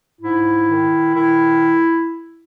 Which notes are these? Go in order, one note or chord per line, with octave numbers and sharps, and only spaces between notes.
G#2 E4
D#3
D#3 E4